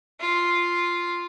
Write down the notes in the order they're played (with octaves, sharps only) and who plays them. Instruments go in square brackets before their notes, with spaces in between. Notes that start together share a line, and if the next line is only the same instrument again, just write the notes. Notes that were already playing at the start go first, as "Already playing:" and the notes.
[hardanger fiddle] F4